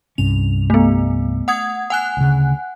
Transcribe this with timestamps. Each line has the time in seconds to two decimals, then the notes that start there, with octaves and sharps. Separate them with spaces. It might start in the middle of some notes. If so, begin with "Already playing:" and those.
0.18 C2 G2 C#4 F7
0.70 A3 B3
1.48 F#5 D#6 G#6
1.90 F#5 G#5 F#6
2.17 D2 C#3